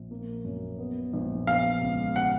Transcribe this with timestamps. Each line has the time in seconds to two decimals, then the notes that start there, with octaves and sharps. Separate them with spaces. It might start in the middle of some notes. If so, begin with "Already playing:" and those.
Already playing: A#1
0.11 A#3
0.45 F#2
0.79 B3
1.13 A#1
1.47 B3 F5
1.82 C#2
2.16 F#5